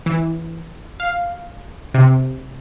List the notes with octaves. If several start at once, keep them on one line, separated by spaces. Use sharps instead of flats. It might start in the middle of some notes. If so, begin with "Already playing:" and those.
E3
F5
C3